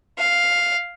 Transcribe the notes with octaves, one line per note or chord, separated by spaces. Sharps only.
F5